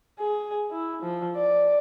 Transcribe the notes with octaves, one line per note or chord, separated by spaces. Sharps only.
G#4
E4
F3
D5